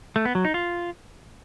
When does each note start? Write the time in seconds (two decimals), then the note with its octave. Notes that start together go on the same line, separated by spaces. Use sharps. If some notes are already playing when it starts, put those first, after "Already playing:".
0.16 A3
0.25 B3
0.35 F#3
0.45 D#4
0.54 F4